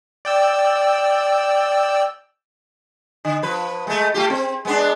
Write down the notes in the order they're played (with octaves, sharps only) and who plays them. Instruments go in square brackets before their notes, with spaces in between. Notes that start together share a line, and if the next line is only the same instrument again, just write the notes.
[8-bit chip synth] D5 G5 E6
[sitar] D3
F3 B4
G#3 A3
A3 F4 G4
C4
G#3 B3 D4